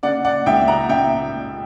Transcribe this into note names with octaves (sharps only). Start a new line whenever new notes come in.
C#3 D5 F#5
D5 F#5
C#2 E5 G5
F#5 A#5
C#3 E5 G5